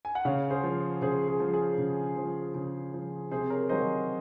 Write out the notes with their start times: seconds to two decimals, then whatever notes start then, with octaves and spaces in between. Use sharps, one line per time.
0.05 G#5
0.15 F#5
0.25 C#3 C#5 F5
0.50 G#4 C5
0.64 F3
1.02 C#3 G#4 C5
1.28 G#4
1.40 F3
1.54 G#4
1.78 C#3
2.17 F3
2.55 C#3
2.94 F3
3.31 C3 G#4 C5
3.50 A#4 C#5
3.69 D#3 F#3 C5 D#5